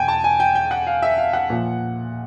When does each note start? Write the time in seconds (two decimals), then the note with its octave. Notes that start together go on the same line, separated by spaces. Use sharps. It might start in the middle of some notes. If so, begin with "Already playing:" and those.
Already playing: E2 B2 G5 G#5
0.08 A5
0.24 G#5
0.40 G5
0.55 G5
0.71 F#5
0.87 F5
1.02 E5
1.18 F5
1.33 F#5
1.50 A#2 F3